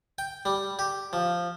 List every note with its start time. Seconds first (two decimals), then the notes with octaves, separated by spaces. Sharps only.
0.18 G5
0.45 G3
0.79 G4
1.13 F3